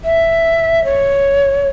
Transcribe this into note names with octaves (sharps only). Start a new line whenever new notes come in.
E5
C#5